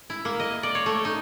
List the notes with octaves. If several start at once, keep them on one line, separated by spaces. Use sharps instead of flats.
E4
A#3
D#5
D5
C#5
A3
D#4